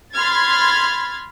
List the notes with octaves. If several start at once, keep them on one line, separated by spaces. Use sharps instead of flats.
B5 C6 F6 G#6 A6